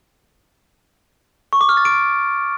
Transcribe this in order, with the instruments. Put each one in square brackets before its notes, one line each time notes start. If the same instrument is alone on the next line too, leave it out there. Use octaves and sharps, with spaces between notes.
[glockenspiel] C#6
D6
F6
A6
D7